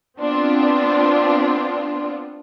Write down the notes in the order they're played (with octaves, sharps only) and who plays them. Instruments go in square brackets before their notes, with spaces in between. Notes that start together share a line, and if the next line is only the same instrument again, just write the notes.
[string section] B3 C4 D4 F4